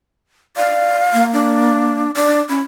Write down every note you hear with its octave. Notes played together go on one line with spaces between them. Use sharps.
D5 F5
A#3
D4
D4 D5
C#4 B5